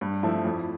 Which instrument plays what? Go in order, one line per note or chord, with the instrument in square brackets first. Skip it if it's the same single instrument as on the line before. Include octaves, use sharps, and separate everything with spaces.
[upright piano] G2
F3 A3 E4
F2